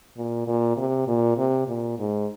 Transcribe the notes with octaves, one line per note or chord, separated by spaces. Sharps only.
A#2
A#2
C3
A#2
C3
A#2
G#2